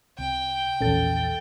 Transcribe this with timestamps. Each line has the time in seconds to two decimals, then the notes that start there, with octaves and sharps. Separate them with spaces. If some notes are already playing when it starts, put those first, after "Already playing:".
0.18 C2 G5
0.80 A#1 E2 C#4 A4 A6